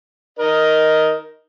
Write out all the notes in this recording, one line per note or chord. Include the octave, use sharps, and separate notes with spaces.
D#4 A#4 D#5